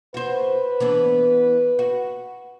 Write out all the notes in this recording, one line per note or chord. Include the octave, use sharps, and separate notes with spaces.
F#4 B4 C5
E3 B3 D4
F#4